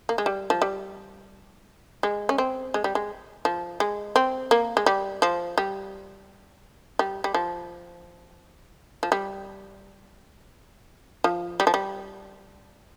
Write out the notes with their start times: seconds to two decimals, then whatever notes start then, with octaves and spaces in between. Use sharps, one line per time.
0.09 A#3
0.18 G#3
0.26 G3
0.50 F3
0.62 G3
2.03 G#3
2.29 C#4
2.38 C4
2.74 G#3
2.84 G3
2.95 G#3
3.45 F3
3.80 G#3
4.16 C4
4.51 A#3
4.77 G#3
4.86 G3
5.22 F3
5.58 G3
6.99 G3
7.24 G3
7.34 F3
9.03 F3
9.12 G3
11.24 F3
11.60 G3
11.67 F3
11.74 G3